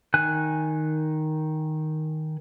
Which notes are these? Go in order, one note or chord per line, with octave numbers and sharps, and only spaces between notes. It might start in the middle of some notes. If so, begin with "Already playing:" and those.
D#3 G#5 F#6